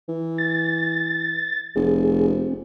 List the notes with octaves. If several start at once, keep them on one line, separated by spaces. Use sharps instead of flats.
E3
A6
F1 G#4
C4